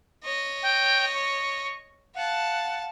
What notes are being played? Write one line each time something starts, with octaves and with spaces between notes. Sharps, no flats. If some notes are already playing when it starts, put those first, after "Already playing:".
C#5 D#5
G5
C#6
F5 F#5 A5